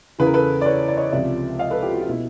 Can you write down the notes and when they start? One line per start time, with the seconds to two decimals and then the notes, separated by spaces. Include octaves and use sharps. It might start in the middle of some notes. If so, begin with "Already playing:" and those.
0.19 E2 C#3 E3 B4
0.27 A#4
0.34 A4 B4
0.61 D5
0.65 B4 C#5
0.88 D5
0.97 C#5 D#5
1.12 C#2 C3 F3 D5 E5
1.59 D#5 F5
1.70 A4 B4
1.82 F4 G4
1.94 F#4
2.01 F4
2.09 B2 E4